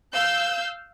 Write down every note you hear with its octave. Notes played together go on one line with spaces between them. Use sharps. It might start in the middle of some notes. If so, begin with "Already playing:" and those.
F5 E6 G6